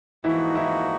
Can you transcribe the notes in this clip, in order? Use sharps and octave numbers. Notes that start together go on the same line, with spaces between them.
G#2 E3 F3 A#3 D#4 E4 F#4
E3 E4